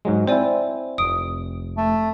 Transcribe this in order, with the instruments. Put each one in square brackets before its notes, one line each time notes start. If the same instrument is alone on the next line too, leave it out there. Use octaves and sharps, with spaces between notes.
[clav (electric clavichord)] G#2 F#3 G#3
[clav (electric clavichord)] C4 E4 [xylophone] C5 D5 G#5
[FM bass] F1 [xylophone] D#6 D7
[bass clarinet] A3